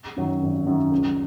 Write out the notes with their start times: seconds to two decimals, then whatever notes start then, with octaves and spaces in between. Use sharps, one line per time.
0.16 F#2 D#3 F#3
0.42 G#1
0.66 F#2 D#3 F#3
0.92 C#2